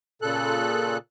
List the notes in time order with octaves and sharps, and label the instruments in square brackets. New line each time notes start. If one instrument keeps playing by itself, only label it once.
[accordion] A#2 C#3 A4 F#6